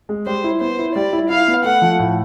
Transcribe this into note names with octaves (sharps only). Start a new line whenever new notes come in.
G#3
G3 C5
E4
B3 C5
E4
G3 D5
E4
E4 F5
B3
A3 F#5
F3
A2